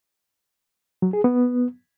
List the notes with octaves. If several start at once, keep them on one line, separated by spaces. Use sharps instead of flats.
F#3
G#4
B3